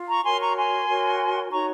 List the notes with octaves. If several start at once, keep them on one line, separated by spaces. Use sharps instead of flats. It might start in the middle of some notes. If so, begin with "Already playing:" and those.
Already playing: F4
A#5 C#6
F#4 A#4 C#5 G#5 C6
A#5 C#6
G#5 C6
F#4 A#4 C#5
D#4 F#4 C#5 A#5 C#6